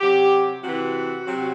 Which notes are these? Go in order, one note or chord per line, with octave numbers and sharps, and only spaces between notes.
C3 F#3 G4
C3 E3 F#4
C3 F#3